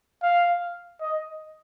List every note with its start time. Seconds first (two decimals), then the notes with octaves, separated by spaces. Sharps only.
0.22 F5
1.01 D#5